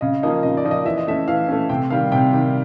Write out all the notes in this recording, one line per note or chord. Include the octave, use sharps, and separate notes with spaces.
C#3 D#5
F3 A#3 D#4
C#3 D#5
D5
F3 A#3 D#4
D#5
E3 E5
D#5
A3 C#4 E5
E3 F5
A3 C#4
C3 G5
D#3 G3 F5
C3 G5
D#3 G3